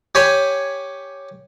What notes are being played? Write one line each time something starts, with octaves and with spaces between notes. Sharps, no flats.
G4 C#5 G#5 B5